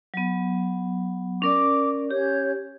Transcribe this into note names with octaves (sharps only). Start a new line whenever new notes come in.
F#3 B3
C#4 A#4 D5 D6
C#4 G4 C#5 G6